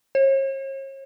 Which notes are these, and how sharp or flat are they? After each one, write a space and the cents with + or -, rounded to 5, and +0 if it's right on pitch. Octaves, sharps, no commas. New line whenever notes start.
C#5 -40